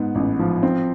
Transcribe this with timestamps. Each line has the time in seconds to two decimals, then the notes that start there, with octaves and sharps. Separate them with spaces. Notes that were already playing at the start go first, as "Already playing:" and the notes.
Already playing: G#2 B3
0.15 A1
0.39 F3
0.63 C4